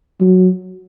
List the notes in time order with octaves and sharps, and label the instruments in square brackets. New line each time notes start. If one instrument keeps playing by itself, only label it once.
[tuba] F#3